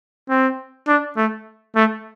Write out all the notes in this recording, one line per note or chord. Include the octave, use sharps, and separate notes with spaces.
C4
D4
A3
A3